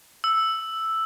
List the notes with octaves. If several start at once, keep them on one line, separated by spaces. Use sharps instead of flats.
E6